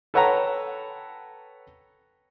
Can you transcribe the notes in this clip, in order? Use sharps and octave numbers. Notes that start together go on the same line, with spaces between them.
A4 B4 C#5 F#5 G5 A#5